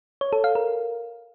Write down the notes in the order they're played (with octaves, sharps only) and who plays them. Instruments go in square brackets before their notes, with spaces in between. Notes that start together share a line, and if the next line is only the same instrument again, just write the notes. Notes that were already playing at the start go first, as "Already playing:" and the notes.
[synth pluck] C#5
A4
F5
A#4